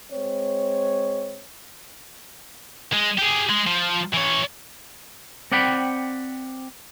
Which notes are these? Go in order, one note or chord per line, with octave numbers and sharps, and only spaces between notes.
G#3 C4 C#5
G#3
G4 G#4
G#3
F3
E3 C#5
C4 D5 F#5 G5 B5